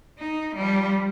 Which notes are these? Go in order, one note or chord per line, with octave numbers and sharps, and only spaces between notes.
D#4
F3 G3